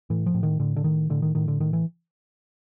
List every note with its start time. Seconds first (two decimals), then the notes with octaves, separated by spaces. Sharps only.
0.10 A2 E3
0.26 F3
0.34 A2
0.43 D#3
0.60 A2 D3
0.76 D3
0.84 A2 D#3
1.10 A2 D3
1.22 D#3
1.35 A2 D#3
1.48 D3
1.60 A2 D#3
1.73 E3